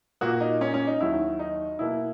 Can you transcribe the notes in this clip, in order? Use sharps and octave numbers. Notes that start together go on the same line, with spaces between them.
A#2 A#3 F#4
D#4
C#4
C#4
D#4
D#2 D#3 F#3 E4
D#4
B2 A#3 E4